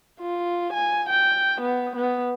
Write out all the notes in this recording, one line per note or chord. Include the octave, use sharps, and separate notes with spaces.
F4
G#5
G5
B3
B3